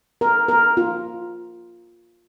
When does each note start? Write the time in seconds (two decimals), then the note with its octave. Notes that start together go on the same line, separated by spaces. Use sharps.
0.21 A#4
0.48 A#4
0.77 F4